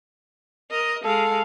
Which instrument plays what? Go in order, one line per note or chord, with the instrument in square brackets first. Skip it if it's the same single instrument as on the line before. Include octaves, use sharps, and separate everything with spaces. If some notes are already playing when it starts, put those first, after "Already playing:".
[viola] A#4 D#5
[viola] G#3 F5 [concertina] A4